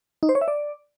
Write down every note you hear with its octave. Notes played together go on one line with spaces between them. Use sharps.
D#4
C5
C#5
E5
D5